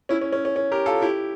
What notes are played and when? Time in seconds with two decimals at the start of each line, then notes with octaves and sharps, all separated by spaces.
0.09 C#4 E4
0.21 C#4
0.33 C#4
0.45 C#4
0.56 C#4
0.72 G4 A#4
0.86 F4 A4
1.02 E4 G4